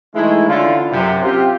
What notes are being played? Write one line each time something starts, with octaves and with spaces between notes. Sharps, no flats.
E3 G#3 A3 D#4 E4
D3 C#4 E4 F4
F#2 C3
C4 F4 G4